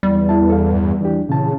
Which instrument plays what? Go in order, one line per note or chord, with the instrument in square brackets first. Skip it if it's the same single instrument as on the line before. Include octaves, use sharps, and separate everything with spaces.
[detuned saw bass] E2 [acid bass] G3
[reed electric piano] E4 A5
A4 F5
G2
E3 D4 G4
[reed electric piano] A#2 E3 A5 [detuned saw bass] C#3